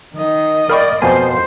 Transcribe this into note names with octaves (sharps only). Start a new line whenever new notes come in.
D#3 D#5
A#4 D5 F5 G5 B5 C#6
F2 B2 A#3 C5 G#5